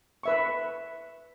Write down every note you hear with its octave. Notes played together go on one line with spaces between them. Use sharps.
B4 E5 C#6